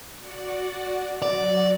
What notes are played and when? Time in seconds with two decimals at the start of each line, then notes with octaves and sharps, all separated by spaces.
0.18 F#4 D5 F#5
1.22 F#3 F#4 D5